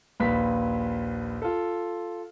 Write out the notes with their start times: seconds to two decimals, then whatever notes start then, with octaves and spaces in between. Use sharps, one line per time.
0.20 A#1 D#2 B4 B6
1.42 F4 A4